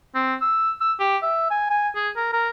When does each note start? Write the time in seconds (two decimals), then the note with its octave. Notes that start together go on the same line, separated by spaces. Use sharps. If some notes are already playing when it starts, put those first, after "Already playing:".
0.15 C4
0.42 E6
0.81 E6
1.00 G4
1.23 E5
1.51 G#5
1.70 G#5
1.96 G#4
2.17 A#4
2.33 A#4